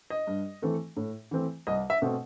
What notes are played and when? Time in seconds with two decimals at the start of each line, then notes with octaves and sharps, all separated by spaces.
0.10 D#5
0.27 G2
0.62 E3 A3 C4
0.96 A2
1.31 E3 A3 C4
1.67 C2 D#5
1.90 E5
2.02 B2 A3 C4